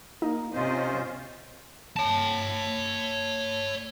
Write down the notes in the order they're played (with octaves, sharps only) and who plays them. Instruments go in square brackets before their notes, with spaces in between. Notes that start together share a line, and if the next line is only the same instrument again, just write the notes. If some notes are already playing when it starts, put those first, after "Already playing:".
[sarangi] A#3 [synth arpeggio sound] D#4
[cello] C3 [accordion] C#4 F4 C5 [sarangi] D#5
[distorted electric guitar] C#5 A5